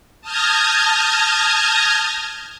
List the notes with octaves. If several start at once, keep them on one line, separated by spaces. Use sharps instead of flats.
A5 D#6 F6 G6 G#6 A#6